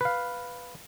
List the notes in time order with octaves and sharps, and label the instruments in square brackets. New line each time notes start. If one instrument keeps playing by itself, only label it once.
[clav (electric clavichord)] B4 F5